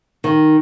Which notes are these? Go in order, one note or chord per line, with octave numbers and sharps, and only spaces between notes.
D#3